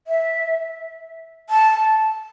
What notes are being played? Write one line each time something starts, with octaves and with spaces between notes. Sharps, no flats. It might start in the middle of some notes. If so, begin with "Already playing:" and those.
E5
A5